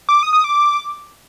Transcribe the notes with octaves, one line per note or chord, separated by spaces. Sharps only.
D6
D#6
D#6
D6